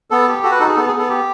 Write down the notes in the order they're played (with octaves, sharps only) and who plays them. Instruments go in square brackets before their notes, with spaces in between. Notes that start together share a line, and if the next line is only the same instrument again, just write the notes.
[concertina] B3 A4
G4
F#4 A4
B4
D#4 A4
G#4
B3 A4
G#4
B3
A4
G4